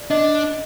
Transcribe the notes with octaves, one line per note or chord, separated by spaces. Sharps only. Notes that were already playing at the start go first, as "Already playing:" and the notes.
Already playing: D5
D4 D#5